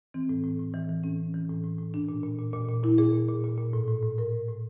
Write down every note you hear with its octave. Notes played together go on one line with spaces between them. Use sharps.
E3 C4
A2
A2
A2
E3
E3
A2 C#4
A2
E3
A2
A2
A2
A#2 D4
A#2
A#2
A#2
A#2
A#2
A#2 E4
A#2 G#4
A#2
A#2
A#2
A#2
A2
A2
A2
A2 A#4
A2
A2